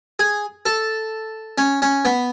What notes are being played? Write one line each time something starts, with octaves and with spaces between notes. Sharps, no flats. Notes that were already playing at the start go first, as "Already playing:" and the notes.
G#4
A4
C#4
C#4
B3